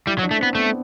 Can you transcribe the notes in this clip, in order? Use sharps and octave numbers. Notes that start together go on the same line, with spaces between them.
G3 E4
F#3
D4
A3
C4
B3
A3 B3